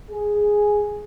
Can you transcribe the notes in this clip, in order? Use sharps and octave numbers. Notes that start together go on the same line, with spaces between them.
G#4